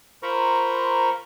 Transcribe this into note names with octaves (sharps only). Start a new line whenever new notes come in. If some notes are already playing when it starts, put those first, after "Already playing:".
F4 A#4 C5 A#5 B5 C#6